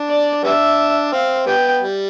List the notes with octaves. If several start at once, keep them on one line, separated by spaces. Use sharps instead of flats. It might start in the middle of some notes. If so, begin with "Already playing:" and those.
Already playing: D4
D5
G3 B3 D4 E5
C4 F5
G3 B3 G5
G3